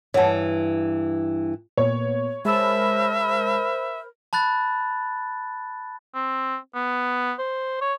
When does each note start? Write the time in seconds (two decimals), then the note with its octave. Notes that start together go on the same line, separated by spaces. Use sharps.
0.14 G2 E3 C#5 F#5 A5
1.77 A#2 B3 C#5
2.45 G#3 A#4 C5 E5 A5 B5 E6
4.33 A5 B5 F#6 A6
6.14 C4
6.75 B3
7.39 C5
7.81 C#5